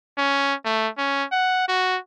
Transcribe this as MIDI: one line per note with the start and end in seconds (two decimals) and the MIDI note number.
0.18 0.54 61
0.65 0.88 57
0.98 1.24 61
1.32 1.64 78
1.68 1.98 66